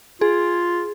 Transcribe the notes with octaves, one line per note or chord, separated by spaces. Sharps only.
F4 G#4